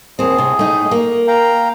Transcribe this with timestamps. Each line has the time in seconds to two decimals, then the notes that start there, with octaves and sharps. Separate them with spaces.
0.19 D#2 A2 C4 G#4
0.38 C3
0.59 A3 D#4
0.91 A#3
1.28 F5 G5 A#5